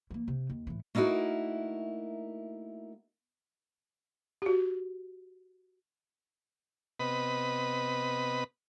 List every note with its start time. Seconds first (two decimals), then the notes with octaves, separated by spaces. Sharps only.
0.10 E3 A#3
0.28 C3
0.50 D#2
0.67 A2 E3
0.95 A3 A#3 D#4 E4 F#4 A#4
4.42 F#4 G4
7.00 C3 B3 B4 D#5 B5